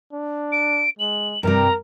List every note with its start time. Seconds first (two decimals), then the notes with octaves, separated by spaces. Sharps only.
0.12 D4
0.52 D7
0.99 G#3 F#7
1.43 G2 C3 G3 A#4 A#5